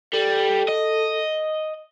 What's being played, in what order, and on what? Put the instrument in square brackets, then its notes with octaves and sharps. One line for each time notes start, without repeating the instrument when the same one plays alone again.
[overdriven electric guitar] G3 [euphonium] A4
[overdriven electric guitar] D#5